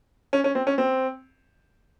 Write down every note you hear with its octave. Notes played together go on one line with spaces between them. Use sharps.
C#4
C#4
C4
C#4
C4